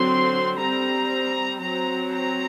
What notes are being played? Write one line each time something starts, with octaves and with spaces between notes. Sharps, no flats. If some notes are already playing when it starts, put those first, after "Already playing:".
Already playing: D3 F#3 C4 C6
G3 C4 A#5
F#3 C4 A#5
A#5